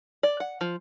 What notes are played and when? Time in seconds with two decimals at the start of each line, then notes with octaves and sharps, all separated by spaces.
0.23 D5
0.40 F#5
0.61 F3